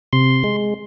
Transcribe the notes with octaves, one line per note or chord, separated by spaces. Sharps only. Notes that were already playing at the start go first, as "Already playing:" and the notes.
C3 C6
G#3